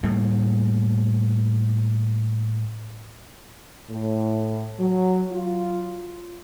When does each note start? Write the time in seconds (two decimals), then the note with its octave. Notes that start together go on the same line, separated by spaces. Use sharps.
0.03 A2 G3 A3 A#3
3.90 A2
4.80 F#3
5.32 F4